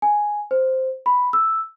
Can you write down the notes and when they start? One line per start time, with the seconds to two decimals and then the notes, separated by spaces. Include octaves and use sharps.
0.02 G#5
0.51 C5
1.06 B5
1.33 E6